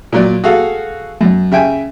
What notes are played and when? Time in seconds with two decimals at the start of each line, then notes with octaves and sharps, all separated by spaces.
0.13 A#2 F#3 D5
0.44 F#4 G#4 A4 F5
1.21 F#2
1.51 C#3 E5 G5 G#5